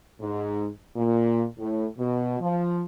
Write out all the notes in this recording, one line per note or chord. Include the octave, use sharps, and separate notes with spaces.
G#2
A#2
A2
B2
F3